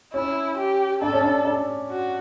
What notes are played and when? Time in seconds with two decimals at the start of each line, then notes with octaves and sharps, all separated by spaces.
0.13 C#4 E4
0.58 G4
1.02 D4 A4
1.13 C#4
1.23 D4
1.45 D4
1.90 F#4